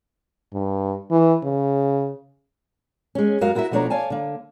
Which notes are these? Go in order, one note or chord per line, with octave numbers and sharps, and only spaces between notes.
G2
E3
C#3
G#3 C#4
F#2 G#3 F#4 A#4 F5
E4 F#4 A#4 D#5 E5
B2 F3 A3 D4 C#5 A#5
C#5 D5 F5 G#5 A5
D3 A#3